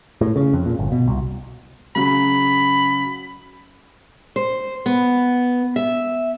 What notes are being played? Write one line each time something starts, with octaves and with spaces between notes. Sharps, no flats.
A2
C#3
F2
A#2
G1
B2
C2
C#3 F#3 B5
C5
B3
E5